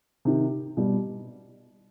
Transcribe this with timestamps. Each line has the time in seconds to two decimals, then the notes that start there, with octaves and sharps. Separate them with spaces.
0.25 C3 D#3
0.77 B2 G3